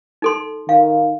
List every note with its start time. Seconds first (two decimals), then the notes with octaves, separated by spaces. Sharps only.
0.22 D#4 A4 C6
0.69 D#3 F5